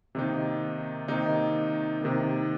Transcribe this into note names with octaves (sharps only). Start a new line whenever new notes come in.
C3 D#3 A#3 D#4
C3 D#3 A#3 D#4
C3 D#3 A#3 D#4